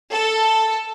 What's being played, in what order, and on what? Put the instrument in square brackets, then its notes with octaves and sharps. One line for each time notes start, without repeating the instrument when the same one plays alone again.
[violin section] A4